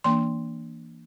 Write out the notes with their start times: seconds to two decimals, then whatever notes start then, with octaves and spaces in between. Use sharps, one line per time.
0.04 E3 A#3 D4 C6